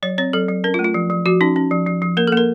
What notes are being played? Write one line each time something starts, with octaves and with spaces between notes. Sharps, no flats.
F#3 C#5
C4 C#5
F#3 A4
F#3
C#4 A#4
F4
A3
F4
F3
F3
F3 F#4
C#4 D#4
C#4
F3
F3
F3
A#3 A#4
A4
A#3 A#4